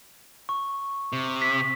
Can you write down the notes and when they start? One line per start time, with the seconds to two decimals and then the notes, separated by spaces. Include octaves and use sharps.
0.49 C#6
1.13 C3
1.42 B6